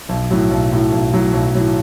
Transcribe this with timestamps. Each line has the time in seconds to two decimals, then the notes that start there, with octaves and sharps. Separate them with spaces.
0.09 B1
0.31 A2 F#3
0.51 B1
0.72 A2 F#3
0.92 B1
1.13 A2 F#3
1.33 B1
1.54 A2 F#3